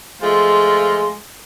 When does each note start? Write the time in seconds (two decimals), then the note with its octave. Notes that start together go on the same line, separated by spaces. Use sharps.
0.21 F3 G#3 A3 F4